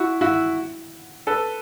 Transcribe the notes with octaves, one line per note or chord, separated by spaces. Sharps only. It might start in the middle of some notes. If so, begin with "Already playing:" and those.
Already playing: E4 F#4
E4 F#4
A4 B4